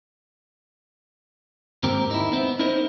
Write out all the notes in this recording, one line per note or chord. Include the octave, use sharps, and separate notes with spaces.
D#2 G#2 C4 G4 A#4
D#4 E4
B3 C4
C#4 D#4 E4 A#4 C5 D#5